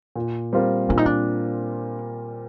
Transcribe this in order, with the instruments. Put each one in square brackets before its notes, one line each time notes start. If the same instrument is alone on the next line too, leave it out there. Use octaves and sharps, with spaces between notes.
[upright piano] A#2
G3 C4 F4 A#4
[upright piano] A#2 [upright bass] D4
[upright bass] D#4
D4